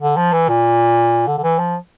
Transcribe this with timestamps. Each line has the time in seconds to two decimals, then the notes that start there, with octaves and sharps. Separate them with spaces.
0.02 D3
0.17 F3
0.33 E3
0.49 A#2
1.27 D3
1.38 D3
1.43 E3
1.59 F3